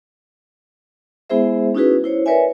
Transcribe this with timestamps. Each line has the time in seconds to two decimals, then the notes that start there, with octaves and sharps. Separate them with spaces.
1.30 G#3 B3 E4 G#4 C5 E5
1.74 C#4 D#4 E4 F#4 G#4 B4
2.04 E4 C5 C#5
2.26 A#4 B4 C#5 D5 E5 G#5